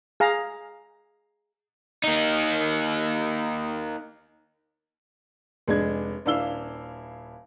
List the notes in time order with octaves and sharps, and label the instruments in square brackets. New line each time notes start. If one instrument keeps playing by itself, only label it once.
[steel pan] G#4 F5 A#5
[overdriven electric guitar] A#3 D#4
[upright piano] F1 G#3 D4 G#6
D#1 D4 E4 F5 E6 G7